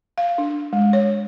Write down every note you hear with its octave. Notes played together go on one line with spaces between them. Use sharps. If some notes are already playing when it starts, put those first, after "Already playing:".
F5
D4
G#3
C#5